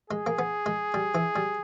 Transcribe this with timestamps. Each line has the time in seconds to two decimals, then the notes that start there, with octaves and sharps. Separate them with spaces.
0.10 G#3 G#4
0.26 A#3
0.39 B3
0.66 G#3
0.94 G3
1.15 E3
1.36 G3